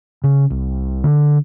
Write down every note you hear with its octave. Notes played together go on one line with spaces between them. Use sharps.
C#3
C2
D3